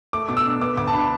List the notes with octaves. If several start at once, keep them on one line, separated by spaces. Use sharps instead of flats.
A3 D6
B2 D6
E6
D4
B3 D6
D2 D6
A5
D4 B5